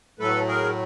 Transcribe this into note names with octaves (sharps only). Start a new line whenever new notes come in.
A2 F#3 A3 A4 B4
G#4 A#4